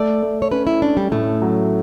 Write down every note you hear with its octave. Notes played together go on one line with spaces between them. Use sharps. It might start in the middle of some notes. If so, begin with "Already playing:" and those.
Already playing: A3 D5
A3
C#5
C#4 B4
E4
C#4 D4
G3
A2 A3
F#3